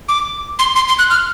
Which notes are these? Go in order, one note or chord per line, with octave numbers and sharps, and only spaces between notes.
D6
C6
C6
C6
F#6
F6